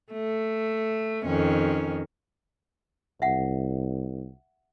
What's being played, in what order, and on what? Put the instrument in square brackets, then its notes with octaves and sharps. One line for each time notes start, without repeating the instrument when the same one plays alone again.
[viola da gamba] A3
F2 D#3 C#4
[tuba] C2 [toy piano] E5 F#5